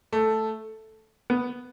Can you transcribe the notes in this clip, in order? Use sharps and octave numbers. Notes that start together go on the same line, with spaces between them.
A3
B3